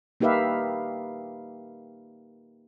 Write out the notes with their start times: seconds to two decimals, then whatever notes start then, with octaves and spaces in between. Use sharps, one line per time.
0.21 A#3 D#4 G4 B4 E5 F5